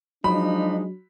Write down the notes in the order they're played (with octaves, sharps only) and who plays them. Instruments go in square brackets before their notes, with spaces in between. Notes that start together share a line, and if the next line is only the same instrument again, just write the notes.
[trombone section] F3 G#3 D#4 [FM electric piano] F#3 [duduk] D4 [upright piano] B5